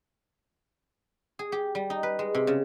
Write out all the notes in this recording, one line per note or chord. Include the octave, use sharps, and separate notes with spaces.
G#4
G4
G3
D#4
B4
G#3
C3
C#3